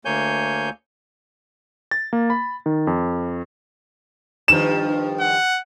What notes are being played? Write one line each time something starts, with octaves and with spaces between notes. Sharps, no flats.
D2 A#3 C#5 G#5 G6
A6
A#3
B5
D#3
F2
G2 D#3 F3 E7
F#5